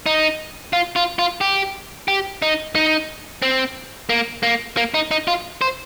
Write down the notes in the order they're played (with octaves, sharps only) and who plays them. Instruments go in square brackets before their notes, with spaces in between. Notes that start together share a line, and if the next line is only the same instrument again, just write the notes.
[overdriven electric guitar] D#4
F4
F4
F4
G4
G4
D#4
D#4
C4
A#3
A#3
A#3
D#4
D#4
F4
C5